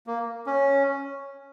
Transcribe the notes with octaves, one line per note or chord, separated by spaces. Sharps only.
A#3
C#4